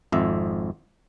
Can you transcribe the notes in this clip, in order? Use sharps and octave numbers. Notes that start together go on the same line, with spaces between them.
G#1 F2 E5